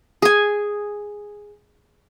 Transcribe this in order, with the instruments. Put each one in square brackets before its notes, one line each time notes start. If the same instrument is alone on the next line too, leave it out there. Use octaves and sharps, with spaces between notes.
[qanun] G#4 G#5